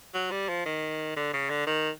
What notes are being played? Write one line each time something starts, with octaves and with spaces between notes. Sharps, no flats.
F#3
G3
F3
D#3
D3
C#3
D3
D#3